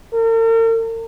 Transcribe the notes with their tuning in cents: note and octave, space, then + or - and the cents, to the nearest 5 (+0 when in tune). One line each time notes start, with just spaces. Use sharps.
A#4 -45